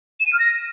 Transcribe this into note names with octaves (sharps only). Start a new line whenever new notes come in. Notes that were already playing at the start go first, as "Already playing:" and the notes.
E7
D#7
F6
A#6